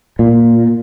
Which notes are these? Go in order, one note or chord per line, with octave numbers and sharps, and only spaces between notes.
A#2